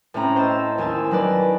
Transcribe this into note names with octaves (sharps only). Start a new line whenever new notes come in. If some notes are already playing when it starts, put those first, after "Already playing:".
A2 A3 C4 C#4 A#5 B5
C5 D#5 A5 E6
D#2 E4 G#5 A5 E6
F#3 D#4 B4 D5